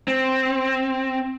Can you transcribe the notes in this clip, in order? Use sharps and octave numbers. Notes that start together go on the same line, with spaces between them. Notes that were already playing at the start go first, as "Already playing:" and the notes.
C4